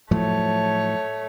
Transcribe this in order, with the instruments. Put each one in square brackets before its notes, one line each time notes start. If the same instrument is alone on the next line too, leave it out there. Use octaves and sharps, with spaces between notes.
[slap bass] A2 F3 F#3 [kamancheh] A3 C#5